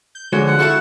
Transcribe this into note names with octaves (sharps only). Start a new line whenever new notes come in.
G6
D3 F3 G#3 F#4 C#5
F#5
E4 F#4 A4 F5 C#6 E7